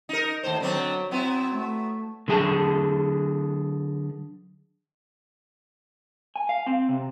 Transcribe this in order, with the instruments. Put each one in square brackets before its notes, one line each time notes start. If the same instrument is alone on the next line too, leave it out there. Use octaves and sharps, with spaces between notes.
[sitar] D#4 A#4
D#2 A2 C5
[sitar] D3 B3 C4 [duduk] F#3
[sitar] F#3 B3 E4 [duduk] C4
[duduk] A3
[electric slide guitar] D3 F#3 G#4 G5 A5
G#5
F5
C4
C3